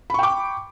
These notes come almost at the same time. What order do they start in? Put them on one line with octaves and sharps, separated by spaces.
B5 C#6 G5 D6